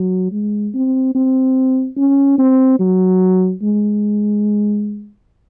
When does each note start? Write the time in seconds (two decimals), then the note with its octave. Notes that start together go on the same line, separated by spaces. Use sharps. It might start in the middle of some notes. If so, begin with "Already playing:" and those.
Already playing: F#3
0.32 G#3
0.74 C4
1.15 C4
1.97 C#4
2.38 C4
2.80 F#3
3.62 G#3